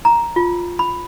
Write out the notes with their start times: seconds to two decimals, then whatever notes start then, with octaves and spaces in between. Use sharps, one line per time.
0.05 A#5
0.36 F4
0.79 B5